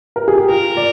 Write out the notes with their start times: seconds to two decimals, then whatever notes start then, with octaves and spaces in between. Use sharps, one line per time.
0.16 A#4
0.28 G#4
0.38 G4
0.50 F4 A#4
0.77 D5